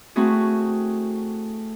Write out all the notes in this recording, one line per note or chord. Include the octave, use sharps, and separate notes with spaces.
A3 C4 E4 F#4 G#4